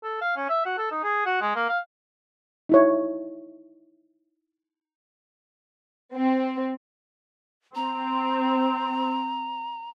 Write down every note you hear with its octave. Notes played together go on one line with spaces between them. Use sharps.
A4
F5
C#4
E5
F#4
A4
D#4
G#4
F#4
G#3
A#3
F5
D#4 E4 C#5
C4
C4 A#5